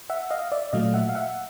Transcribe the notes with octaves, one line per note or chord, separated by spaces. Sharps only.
E5 F#5
D#5 F5
D5 E5
A#2 F#3 A3 D#5 F5
E5 F#5
F5
E5 F#5